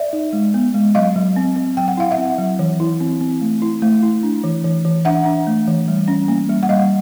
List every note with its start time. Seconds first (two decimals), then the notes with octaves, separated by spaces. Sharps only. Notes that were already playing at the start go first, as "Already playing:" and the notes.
Already playing: D5 E5
0.13 D#4
0.33 G#3
0.54 B3
0.74 G#3
0.95 F#3 D#5 F5
1.16 F#3
1.36 C4
1.56 C4
1.77 F#3 G5
1.88 F#5
1.97 E4 F5
2.11 E5 F#5
2.18 C4
2.39 F#3
2.59 E3
2.80 E4
3.00 C4
3.21 C4
3.41 A3
3.62 E4
3.82 A3
4.03 E4
4.23 D4
4.44 E3
4.65 E3
4.85 E3
5.05 D4 E5 F#5
5.26 D4
5.47 A3
5.67 E3
5.88 G3
6.08 C#4
6.28 A#3
6.49 G3
6.63 F#5
6.69 G3 D#5 F5